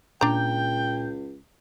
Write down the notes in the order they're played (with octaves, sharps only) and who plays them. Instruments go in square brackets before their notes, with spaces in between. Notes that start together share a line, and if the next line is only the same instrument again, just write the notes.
[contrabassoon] C#2 [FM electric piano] A#2 G6 [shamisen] D4 A#5 [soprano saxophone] G5